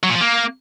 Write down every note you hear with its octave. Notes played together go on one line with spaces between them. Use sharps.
F#3
A#2
F3
A#3